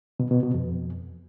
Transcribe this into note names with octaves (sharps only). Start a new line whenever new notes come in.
B2
B2
B2
F2